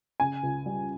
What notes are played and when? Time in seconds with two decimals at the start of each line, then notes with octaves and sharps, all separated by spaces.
0.20 C#3 G#5
0.43 C#2
0.66 G3